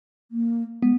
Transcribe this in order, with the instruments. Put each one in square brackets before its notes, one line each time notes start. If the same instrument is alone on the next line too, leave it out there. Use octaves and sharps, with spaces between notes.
[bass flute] A#3
[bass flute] G#3 [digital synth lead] B3